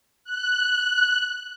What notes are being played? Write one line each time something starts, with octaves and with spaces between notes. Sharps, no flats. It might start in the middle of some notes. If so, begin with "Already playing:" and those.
F#6